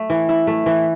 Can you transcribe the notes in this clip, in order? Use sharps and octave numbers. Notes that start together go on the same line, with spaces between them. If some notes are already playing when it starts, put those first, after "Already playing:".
Already playing: A3
E3
E4
A3
E3